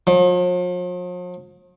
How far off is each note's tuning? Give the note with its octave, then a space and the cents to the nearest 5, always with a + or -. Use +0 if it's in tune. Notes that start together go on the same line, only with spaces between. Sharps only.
F3 +45